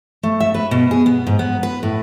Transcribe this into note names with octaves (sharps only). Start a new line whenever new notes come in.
A3
E5
B4
B2
G#4
B3
G#2
B3
B4
A2